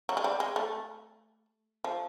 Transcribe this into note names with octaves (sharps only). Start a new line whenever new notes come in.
F#3
G#3
G3
G#3
A3
F3